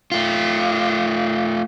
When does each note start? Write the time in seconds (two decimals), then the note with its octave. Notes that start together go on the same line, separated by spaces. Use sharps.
0.12 A3 F4